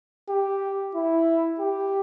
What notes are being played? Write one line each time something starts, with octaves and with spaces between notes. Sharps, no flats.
G4
E4
G4